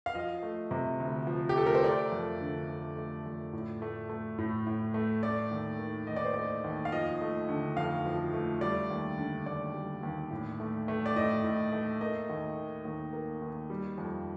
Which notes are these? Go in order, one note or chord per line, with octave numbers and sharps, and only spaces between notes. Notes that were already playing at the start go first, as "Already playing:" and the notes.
F5
F3 D#5
A3
C3
D2
F3
G4
A3 A4
A#4
C5
A3 D5
F2
D3
F2
A3
F2
A2
A3
A3
A2
A2
A3
A3 D5
D#2
D#3
D#2 D#5
D5
C5
A3 D5
D#2
F5
F3 D#5
A3
D3
F2 F5
F3
A3
G3 D5
D#2
D3
D#2 D5
G3
D#2
A2
A3
A3
D5
A2 D#5
A2
A3
A#3 D#5
D#2
D#3
D#2
A#3
D#2
G3
F2